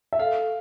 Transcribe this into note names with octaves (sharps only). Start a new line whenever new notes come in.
E5
A4 F5